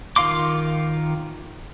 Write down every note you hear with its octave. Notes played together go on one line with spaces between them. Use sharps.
D#3 F4 F5 C6 D6